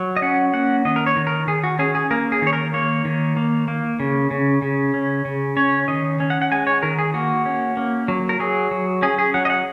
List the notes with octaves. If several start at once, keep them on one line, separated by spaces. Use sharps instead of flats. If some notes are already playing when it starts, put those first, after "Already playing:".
Already playing: F#3
D#5
C#4 F#5
A#3 F#5
D#3 D#5
A#4
C#5
D#3
A#4
D#3 G#4
F#4
C#4 G#4
G#4
A#3 A#4
G#4
D#3 C#5
A#4
A#3 C#5
D#3
A#3
A#3
C#3
C#3
C#3
C#4
C#3
C#4 C#5
D#3 D#5
C#4
F#5
F#5
G#3 G#5
C#5
D#3 A#4
G#4
A#3 F#4
C#4
A#3
F#3
A#4
F#3 G#4
F#3
C#4 G#4
G#4
F#3 F#5
D#5
F#5